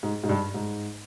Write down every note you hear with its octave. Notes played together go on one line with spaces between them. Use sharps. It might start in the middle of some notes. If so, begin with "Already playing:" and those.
G#2
G#2
G2
G#2